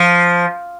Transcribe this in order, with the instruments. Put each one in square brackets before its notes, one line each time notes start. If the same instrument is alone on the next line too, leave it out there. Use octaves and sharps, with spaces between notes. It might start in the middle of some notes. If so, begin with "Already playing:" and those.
Already playing: [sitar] F3